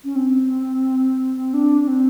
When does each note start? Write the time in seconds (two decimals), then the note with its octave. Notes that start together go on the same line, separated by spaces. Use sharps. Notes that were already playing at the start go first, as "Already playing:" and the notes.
0.04 C#4
0.15 C4
1.54 D4
1.88 C4